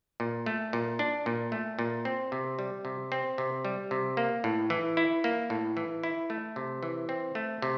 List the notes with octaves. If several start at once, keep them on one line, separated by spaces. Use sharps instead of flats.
A#2
A3
A#2
D4
A#2
A3
A#2
C4
C3
G3
C3
C4
C3
G3
C3
A#3
A2
E3
E4
A#3
A2
E3
E4
A3
C3
E3
C4
A3
C3